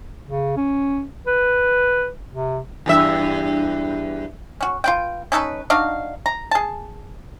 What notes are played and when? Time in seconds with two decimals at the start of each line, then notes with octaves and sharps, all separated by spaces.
0.27 C#3
0.57 C#4
1.27 B4
2.30 C3
2.86 E2 G2 E5
4.61 C#4 F#4
4.84 F4 B4 G5
5.32 C#4 D#4 A4 B4
5.70 D4 D#4 F#4 F5
6.26 A#5
6.51 G#4 A5